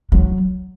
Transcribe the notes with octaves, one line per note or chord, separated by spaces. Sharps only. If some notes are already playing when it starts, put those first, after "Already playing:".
F#3